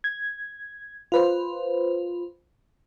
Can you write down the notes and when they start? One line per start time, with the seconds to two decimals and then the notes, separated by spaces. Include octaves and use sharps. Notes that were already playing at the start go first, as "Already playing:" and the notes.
0.04 G#6
1.12 F4 B4 C5